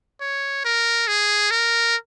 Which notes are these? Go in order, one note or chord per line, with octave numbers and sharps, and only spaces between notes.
C#5
A#4
G#4
A#4